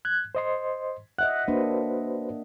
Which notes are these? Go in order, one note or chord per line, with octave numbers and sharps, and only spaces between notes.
F#6 G#6
C5 D#5 C6
D#5 E5 F#5 F#6
A#3 D4 F#4 B4 C5